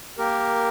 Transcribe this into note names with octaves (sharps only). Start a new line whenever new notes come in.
A#3 G4 A#4